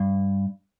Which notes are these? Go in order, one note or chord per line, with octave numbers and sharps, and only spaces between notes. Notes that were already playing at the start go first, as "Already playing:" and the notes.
Already playing: G2